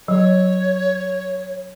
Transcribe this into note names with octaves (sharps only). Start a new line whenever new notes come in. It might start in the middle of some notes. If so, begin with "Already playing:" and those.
F#3 C#5